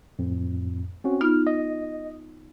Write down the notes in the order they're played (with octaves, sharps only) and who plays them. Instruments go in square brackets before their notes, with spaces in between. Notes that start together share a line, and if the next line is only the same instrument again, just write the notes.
[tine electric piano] F2 A2
C4 C#4 F#4
[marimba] B3 D#4 F4 [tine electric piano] F6
[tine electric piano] D#5